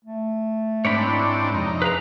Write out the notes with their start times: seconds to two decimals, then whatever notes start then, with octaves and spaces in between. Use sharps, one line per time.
0.05 A3
0.85 G#2 C4 D4 C#5 D5 B5
1.05 E4
1.54 F2 C3 D#4
1.82 G#4 B4 F5 A#5